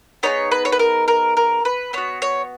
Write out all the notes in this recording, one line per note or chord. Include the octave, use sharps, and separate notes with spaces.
B3 D#4 G#4 C#5
B4
C#5
B4
A#4
A#4
A#4
B4
B3 F#4 C#5
C#5